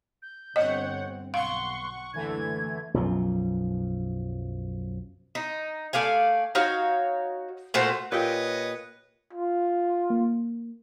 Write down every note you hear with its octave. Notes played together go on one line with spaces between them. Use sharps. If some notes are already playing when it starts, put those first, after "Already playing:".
G6
G1 C4 C#5 D#5 F#5
B1 F5 F#5 C6 C#6
F#1 D2 D3 E3 A3 G#6
B1 F#2 F3
D#4
A3 D5 F5 G#5
D#4 F#4 C#5 F5
A#2 A3 F#4 C5
A#2 G4 B4 C#5 D#5 G5
F4
A#3